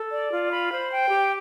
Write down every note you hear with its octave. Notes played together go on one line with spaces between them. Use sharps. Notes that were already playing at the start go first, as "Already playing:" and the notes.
Already playing: A4
D5
F4
B5
C5
G5
G4